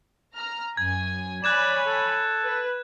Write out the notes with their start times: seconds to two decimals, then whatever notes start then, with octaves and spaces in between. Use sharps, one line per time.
0.34 A#5 F6
0.77 F#2 G#5 G#6
1.44 C#5 D5 G#5 B5 F#6 G#6 E7
1.87 A4
2.45 B4